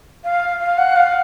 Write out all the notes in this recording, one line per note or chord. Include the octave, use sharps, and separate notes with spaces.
F5
F5
F#5
F5